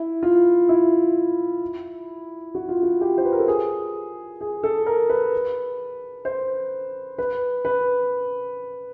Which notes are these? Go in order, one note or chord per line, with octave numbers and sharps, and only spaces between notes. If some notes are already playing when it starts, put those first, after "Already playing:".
Already playing: E4
F4
E4
F#4
F4
F#4
G4
C5
B4
A#4
A4
G#4
G#4
A4
A#4
B4
C5
B4
B4